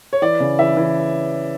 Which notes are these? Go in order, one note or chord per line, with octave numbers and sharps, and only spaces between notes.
C#5
E3 D5
C#3
E3 E5
E3